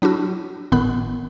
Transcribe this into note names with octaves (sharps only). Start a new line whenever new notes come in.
F#3 D4 E4 F#4 E6
G1 A2 D#3 B3 B5 F#6